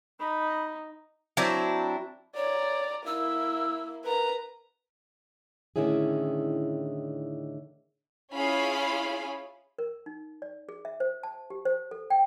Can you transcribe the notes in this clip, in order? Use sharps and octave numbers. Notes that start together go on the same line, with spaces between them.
D#4 B5
F#3 C4 D4 E4
C#5 D5 A#5
A#3 E4 E6
A#4 B4 A#5
A2 D3 D#3 C#4 E4 G#4
C#4 E4 F4 G#4 F5 B5
A#4
D#4
D5
G#4
E5
C5
A5
G4
C5
A4
G5